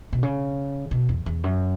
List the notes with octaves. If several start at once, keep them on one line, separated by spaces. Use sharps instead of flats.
B2
C#3
B2
E2
E2
F#2